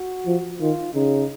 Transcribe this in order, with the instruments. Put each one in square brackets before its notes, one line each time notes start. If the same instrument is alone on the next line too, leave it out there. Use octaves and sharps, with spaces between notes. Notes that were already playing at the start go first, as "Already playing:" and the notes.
Already playing: [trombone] F#4
[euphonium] F3
[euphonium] D#3 [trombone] F4
[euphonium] C#3 [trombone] D#4